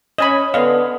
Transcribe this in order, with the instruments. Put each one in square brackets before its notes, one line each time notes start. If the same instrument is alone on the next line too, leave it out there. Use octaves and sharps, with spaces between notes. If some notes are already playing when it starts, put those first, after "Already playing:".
[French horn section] C#4 [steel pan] D#5 G#5 B5
[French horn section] D3 B3 [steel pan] D#5 F5